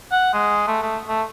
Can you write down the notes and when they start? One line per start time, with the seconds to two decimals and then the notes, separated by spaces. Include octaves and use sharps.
0.12 F#5
0.33 G#3
0.67 A3
0.82 A3
1.08 A3